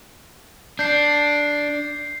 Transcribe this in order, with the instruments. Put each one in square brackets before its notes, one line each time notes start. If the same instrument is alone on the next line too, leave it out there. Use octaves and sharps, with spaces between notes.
[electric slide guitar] D4 [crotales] G6 C7